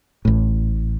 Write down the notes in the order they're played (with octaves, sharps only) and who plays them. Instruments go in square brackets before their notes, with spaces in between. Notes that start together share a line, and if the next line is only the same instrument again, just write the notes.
[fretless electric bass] A1 A2